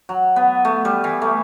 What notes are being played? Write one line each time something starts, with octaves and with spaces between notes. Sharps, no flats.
F#3
B3
A3
G3
E3
A3